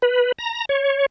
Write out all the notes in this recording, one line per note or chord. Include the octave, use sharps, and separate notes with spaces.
B4
A#5
C#5